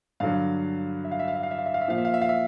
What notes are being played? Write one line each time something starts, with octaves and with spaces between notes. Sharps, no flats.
G2 D3 F#3 F5
E5
F5
E5
F5
E5
F5
E5
F5
E5
F5
E5
A#2 F3 F5
E5
F5
E5
F5
E5